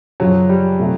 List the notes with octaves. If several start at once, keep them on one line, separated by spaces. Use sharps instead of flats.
F#2 C#3 F3 F#3
G3
C3 F3 A3